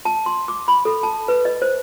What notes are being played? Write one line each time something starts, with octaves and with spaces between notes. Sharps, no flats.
A5
C6
D6
B5
A4
A5
B4
D#5
C5